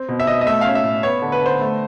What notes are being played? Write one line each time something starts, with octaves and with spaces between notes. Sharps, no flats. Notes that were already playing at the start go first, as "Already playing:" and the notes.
Already playing: C4
B2
E5
B2 D#5
D#5
A3 E5
C#4 F5
E5
A2
B3 C#5
D3
B4
D3 C5
A3